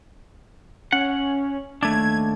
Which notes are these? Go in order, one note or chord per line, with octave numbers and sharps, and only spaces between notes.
C#4 F#5
D#2 A3 D4 G#6